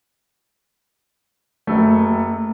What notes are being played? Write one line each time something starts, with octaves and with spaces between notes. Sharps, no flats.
F#1 A3